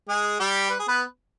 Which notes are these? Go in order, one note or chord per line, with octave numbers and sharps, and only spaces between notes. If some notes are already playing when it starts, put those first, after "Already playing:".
G#3 G#4
G3 G4
B4
G#4
B3 B4